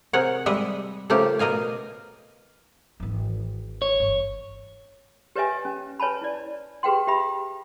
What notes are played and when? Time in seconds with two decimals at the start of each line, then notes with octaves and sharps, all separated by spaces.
0.13 C3 G#4 A#4 C#5 F#5
0.46 G3 G#3 D#5 E5
1.10 C#3 F3 A3 G4 A#4 F5
1.39 B2 A#4 D#5 F5 G#5
3.00 G#1 E3
3.82 C#5
4.00 G1
5.36 G4 B4 C#5 D#5 E5 G#5
5.65 C#4
6.00 B4 C#5 G#5 A5 B5
6.21 E4 D5
6.83 G4 G#4 B4 F#5 G5 C6
7.07 G4 E5 B5